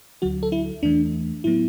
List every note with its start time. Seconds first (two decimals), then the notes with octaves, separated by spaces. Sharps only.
0.22 D2 D3 F#3 F#4
0.43 A4
0.52 E4
0.83 E2 E3 A3 D4
1.44 A2 F#3 B3 E4